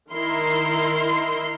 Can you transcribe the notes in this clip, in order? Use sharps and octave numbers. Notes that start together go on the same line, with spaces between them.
D#3 E4 A#4 C6